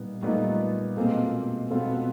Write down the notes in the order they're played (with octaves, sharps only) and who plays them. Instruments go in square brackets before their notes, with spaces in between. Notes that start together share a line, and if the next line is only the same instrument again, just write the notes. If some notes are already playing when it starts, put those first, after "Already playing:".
Already playing: [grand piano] A#2 G3 B3 D#4
[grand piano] A#2 G3 B3 D#4 [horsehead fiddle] A3
[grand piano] B2 G#3 C4 F4 A4 [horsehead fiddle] A#3
[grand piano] B2 G#3 C4 F4 A4 [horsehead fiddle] B3